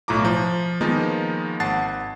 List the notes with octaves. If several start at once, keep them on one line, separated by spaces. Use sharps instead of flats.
B1 A2 F4 A#5 D6
F3
D#3 F3 G#3 A#3 B3 D#4
G#1 F#5 A5 A6 C7